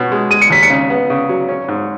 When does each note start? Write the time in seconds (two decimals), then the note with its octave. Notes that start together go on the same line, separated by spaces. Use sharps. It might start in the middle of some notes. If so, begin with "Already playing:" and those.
Already playing: B2 C#4
0.12 G#3
0.31 G#3 D#7
0.42 C#7
0.50 D#2 B6
0.63 C#7
0.70 C#3
0.90 B3
1.10 C#3
1.29 F#3
1.49 C#4
1.68 G#2